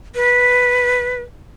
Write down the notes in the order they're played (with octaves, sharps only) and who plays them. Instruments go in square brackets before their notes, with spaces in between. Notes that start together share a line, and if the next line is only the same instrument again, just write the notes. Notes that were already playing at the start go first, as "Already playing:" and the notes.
[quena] B4